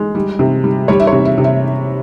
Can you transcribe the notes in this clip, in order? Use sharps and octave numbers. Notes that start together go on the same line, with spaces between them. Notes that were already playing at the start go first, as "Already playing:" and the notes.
Already playing: G#3
G3
C3
G3
G3 C#5
E5
C#5
C3
E5
C3
E5